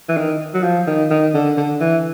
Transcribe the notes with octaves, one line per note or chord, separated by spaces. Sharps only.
E3
D#3
F#3
F3
D#3
D#3
D3
D3
E3